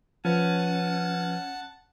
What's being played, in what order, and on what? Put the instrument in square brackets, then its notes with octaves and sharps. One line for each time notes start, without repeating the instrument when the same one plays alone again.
[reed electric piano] F3 B4 [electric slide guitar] C#4 [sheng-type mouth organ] F#5 A5